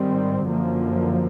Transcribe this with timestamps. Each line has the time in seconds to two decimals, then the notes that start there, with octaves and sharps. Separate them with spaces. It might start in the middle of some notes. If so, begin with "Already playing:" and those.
Already playing: G#2 D#3 G3 C4
0.45 F#2 D3 F3 A#3